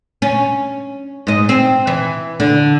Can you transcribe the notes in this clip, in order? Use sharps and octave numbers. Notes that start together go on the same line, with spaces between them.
C#4
G#2 D#5
C4
E3
D3